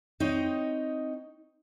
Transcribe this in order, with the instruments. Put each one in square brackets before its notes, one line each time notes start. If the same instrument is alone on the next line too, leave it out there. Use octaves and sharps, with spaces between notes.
[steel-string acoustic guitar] C4 D#4 C#5 D#5